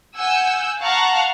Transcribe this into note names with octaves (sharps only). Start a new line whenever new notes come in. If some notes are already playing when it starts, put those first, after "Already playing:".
F#5 G#5 E6 G6
F5 F#5 A5 A#5 C#6 F#6